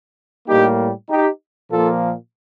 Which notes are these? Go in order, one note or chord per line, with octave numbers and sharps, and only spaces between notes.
A2 G3 A#3 D#4 G4
D#4 G4
A#2 F3 A#3 F4 A4